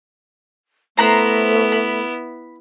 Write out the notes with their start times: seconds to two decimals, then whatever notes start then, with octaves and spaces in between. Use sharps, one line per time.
0.98 A3 B3 E4 C5 A#5 F#6
1.72 B5